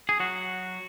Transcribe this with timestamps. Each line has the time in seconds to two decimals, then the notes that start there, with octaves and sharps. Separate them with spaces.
0.09 G#4
0.20 F#3 F#4